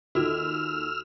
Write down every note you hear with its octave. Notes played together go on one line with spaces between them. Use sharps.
D#2 D#3 F4 F#4 A4 E6 F6